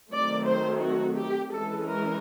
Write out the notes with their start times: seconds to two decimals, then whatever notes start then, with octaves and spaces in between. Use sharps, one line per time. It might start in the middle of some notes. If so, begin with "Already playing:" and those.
0.12 D#3 F#3 A3 C4 D5
0.46 C5
0.82 F#4
1.17 G4
1.52 E3 G#3 C#4 A4
1.87 A#4